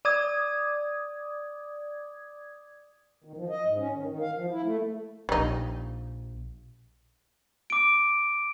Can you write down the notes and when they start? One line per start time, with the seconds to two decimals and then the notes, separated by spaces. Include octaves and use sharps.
0.05 D5 D6 D#6 G#6
3.24 D#3
3.37 F3
3.49 D#5
3.66 G#2
3.79 C#4
3.93 D#3
4.06 D#3
4.21 F5
4.37 F3
4.51 E4
4.65 A3
5.29 A#1 G3 D#4
7.70 D6 D7